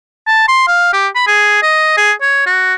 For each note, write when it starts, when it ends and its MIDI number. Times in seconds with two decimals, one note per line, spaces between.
0.27 0.45 81
0.48 0.66 84
0.68 0.88 77
0.93 1.08 67
1.15 1.22 83
1.27 1.59 68
1.62 1.96 75
1.97 2.12 68
2.21 2.42 73
2.46 2.74 66